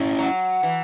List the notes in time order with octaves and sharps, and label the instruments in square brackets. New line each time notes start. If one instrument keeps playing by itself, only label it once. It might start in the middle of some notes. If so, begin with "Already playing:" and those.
Already playing: [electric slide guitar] C#4 E4
[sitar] F#3
E3